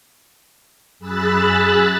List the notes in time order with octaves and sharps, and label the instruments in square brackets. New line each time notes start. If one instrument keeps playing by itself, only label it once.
[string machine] F#2 G#4 B5 E6 F#6 A6